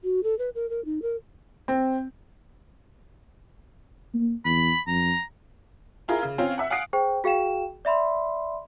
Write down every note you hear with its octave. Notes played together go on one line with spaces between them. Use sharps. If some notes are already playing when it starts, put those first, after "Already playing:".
F#4
A4
B4
A#4
A#4
D#4
A#4
C4
A#3
E2 B5
F2 A#5
E4 F4 G#4 A#4
C#3
C4 C#4 F4
E5 F#5
F5 F#5 G#5 D#6 C7 D7
G#4 C5 G5
F#4 G#4 F5 G5 E7
D5 E5 B5 C6